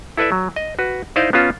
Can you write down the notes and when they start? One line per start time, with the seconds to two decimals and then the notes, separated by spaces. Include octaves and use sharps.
0.17 E4 A4 B4 D5 E5
0.32 F#3
0.56 D#5
0.79 F#4 B4
1.16 D#4 E4 C5 D5 D#5 F5
1.33 B3 C#4 F4 A5